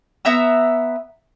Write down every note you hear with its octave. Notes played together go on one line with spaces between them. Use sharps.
B3 E5 A#5 E6